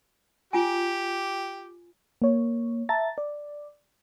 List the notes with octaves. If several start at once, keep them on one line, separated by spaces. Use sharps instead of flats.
F4 G4 G#5
A#3 C#5
E5 A5 A#5 A6
D5